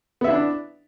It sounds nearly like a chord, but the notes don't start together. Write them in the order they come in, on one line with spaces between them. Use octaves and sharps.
B3 E5 E4 D4